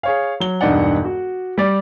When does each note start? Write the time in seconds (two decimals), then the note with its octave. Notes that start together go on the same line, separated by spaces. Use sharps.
0.03 G#4 C#5 F5
0.40 F#3 G7
0.61 E1 G2 D#4 D5 F#5
1.04 F#4
1.58 G3 D5